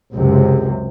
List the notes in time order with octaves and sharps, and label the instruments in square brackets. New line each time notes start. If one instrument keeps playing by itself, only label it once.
[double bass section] C#2 F#2 C3